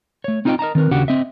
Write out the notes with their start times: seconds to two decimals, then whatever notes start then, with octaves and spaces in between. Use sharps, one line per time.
0.24 A3 C#5
0.45 C4 D#4 F4 A4 D#5 G5
0.59 A#4 D#5 A5 A#5
0.75 D#3 C4 A#4 B4
0.91 D#2 C#3 D4 F#4 G4 F#5
1.08 C4 D#5 E5